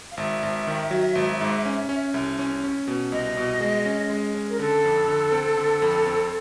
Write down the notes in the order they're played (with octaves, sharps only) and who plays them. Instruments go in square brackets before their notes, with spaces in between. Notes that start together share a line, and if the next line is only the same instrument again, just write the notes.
[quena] F5
[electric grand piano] G#1 [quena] E5
[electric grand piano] G#1
D#3
F#3
G#1
G#2
C#4
C#4
C2
C#4
C#4
B2
[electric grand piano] C2 [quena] D#5
[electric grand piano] B2
G#3
C#4
G#3
C#4
[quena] A#4
[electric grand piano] D3 [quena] A4
[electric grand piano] F2
D3
C4
D3
F2
C4